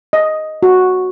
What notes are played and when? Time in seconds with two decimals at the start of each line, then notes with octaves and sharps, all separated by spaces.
0.13 D#5
0.63 F#4